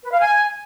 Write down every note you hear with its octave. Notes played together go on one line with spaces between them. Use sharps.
B4
F5
G#5